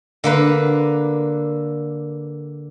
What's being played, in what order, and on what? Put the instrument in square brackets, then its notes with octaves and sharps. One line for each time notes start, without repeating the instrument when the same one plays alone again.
[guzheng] D3 A#3 B4